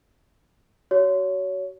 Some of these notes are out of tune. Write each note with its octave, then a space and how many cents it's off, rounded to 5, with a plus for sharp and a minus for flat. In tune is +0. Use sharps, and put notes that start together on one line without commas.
F#4 +30 C#5 +20